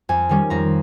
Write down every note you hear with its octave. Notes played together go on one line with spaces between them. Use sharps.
F2 G#5
D#3 G3 C#4
F2 A#5